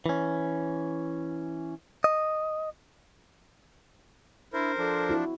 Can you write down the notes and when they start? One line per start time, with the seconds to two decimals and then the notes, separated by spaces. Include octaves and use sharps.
0.06 E3 C#4
2.04 D#5
4.53 D4 E4 A#4 C5
4.78 F3 D4 A4
5.09 C4 E4 F#4